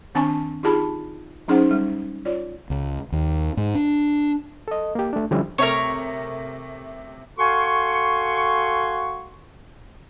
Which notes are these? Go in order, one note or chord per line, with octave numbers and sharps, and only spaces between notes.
D#3 C4 D4 G#5 A5 C#6
D#4 F4 G4 G#4 A5 B5
F#3 C#4 D#4 G#4 C5 F#5
G3
F4 C#5 D5
C#2
D#2
G#2
D4
A4 D#5
A#3 G4
A3 D4
D3 F3 G3 C#4 E4
C3 A3 A#4 C#5
F#4 A4 F5 G#5 C6 C#6